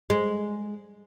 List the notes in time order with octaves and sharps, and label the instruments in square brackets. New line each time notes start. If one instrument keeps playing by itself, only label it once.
[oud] G#3